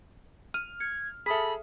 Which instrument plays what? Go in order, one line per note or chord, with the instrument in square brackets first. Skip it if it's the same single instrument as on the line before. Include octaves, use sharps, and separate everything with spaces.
[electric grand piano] F6 [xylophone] D#7
[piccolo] G#6 [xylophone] C#7
[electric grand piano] G#4 A4 [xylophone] E5 D#6 B6 [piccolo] B5